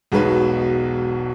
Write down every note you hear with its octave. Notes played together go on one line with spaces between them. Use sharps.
E1 B1 B2 G#3 D#4 B4